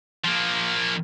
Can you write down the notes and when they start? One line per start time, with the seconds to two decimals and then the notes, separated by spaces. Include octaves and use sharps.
0.24 F3 A#3